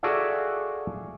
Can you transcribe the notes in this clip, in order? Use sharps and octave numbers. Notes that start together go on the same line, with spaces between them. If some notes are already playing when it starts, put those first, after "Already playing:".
F#4 G#4 A4 D5 E5 F5